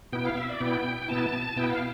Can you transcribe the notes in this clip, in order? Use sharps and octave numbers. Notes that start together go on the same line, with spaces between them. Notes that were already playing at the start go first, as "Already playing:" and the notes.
B2 B3 E4 G5
F5
E5
D5
B2 B3 E4 G5
G5
B2 B3 E4 A5
B2 B3 E4 G5
F5